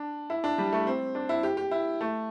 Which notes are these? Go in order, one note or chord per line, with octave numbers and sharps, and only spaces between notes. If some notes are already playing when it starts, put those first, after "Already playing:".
Already playing: D4
E4
D4
G3
A3
C4
D4
E4
G4
G4
E4
A3